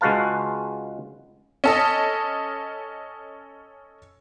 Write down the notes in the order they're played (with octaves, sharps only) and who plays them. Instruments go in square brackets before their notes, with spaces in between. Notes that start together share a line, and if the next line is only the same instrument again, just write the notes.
[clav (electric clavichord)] C#2 G#3 F#4 B4 F5 A5
[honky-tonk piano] C#4 A4 D#5